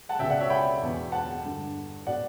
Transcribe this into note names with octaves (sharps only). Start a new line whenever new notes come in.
F#5 A5
C#2 B2 E5 G5
D5 F#5
C#5 E5
G5 B5
E2 B2
F#5 A5
G2 D3
B2 D5 F#5